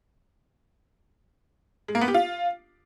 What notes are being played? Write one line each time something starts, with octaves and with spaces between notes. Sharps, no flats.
G#3
A#3
B3
G4
F4